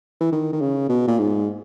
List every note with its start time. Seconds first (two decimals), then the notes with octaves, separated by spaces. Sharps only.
0.21 E3
0.32 D#3
0.53 D#3
0.61 C#3
0.89 B2
1.08 A#2
1.18 G#2